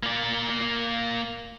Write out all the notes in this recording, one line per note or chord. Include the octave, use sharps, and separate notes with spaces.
A#3 D5